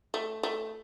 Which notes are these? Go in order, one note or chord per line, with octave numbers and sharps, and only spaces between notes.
A3
A3